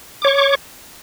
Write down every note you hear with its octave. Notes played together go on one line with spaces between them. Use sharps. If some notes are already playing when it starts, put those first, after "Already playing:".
C#5 C#6 D6